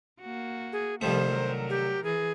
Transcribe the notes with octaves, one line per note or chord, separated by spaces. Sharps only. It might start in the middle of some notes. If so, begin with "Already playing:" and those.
A#3 F#4
G#4
C2 D#3 F3 G3 A3 C5
F#3 A#4
G4
E3 G#4